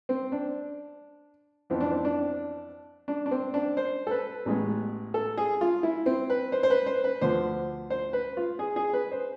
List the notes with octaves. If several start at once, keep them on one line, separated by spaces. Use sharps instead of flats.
C4
D4
F2 E3 B3 C4
D4
C4
D4
D4
D4
C4
D4
C5
A4
B4
A1 A2 G#3 B3
A4
G#4
F4
E4
C4
B4
C5
C5
B4
C5
B4
D2 D3 F3 C5
C5
B4
F4
G#4
G#4
B4
C5